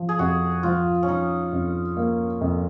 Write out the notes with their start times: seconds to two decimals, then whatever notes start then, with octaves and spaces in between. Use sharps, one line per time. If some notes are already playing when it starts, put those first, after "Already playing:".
Already playing: F3
0.09 G#4
0.19 F2 F#4
0.63 F3 F4
1.03 C#4
1.08 F3 D#4
1.53 F2
1.97 A#3
2.41 F2